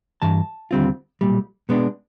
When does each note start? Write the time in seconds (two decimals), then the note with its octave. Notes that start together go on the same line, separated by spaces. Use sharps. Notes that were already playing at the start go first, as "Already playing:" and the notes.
0.22 G2 E3 A5
0.71 D#2 D3 G3 C4 F4
1.21 B1 A#2 G3
1.69 B2 G#3 B3 D4